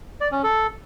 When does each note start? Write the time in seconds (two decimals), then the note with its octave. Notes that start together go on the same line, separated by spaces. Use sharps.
0.21 D5
0.32 C#4
0.43 A4